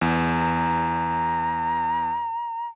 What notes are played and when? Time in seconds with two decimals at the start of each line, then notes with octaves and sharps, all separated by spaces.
0.01 E2
0.33 A#5